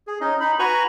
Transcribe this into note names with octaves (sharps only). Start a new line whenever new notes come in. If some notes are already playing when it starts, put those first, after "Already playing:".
G#4
C#4 D#4 D#5
D#4 B5
F#4 B4 G#5 A#5 B5 C#6